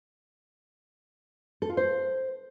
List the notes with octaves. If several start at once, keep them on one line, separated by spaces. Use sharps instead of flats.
A4
F4
C5